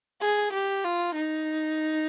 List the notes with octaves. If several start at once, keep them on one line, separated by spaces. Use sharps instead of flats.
G#4
G4
F4
D#4